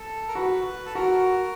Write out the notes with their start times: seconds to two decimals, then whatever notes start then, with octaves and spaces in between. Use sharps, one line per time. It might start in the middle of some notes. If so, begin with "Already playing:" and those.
Already playing: A4
0.28 A#4
0.35 F#4 B4
0.86 A4
0.95 F#4 A#4